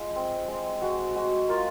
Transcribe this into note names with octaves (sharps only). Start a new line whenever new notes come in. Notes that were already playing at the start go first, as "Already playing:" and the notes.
Already playing: G#3 F4
C4
G#3
G#3 F#4
G#3 F#4
A#3 F4